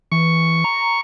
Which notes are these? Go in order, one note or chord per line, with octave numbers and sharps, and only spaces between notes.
E3 C#6
A#5